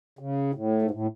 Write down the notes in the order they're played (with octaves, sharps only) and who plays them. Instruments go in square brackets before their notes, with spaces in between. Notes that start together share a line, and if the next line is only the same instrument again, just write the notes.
[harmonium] C#3
A2
G#2
A2